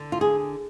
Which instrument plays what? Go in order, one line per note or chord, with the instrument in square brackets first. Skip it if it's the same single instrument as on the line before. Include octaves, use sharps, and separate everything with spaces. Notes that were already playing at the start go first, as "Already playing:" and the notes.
Already playing: [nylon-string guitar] D3
F4
G#4